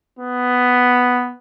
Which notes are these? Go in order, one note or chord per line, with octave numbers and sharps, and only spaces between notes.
B3